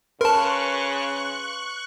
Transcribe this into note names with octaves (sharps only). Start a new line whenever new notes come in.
C#3 A#4 B4 A5 C6 C#6 F#6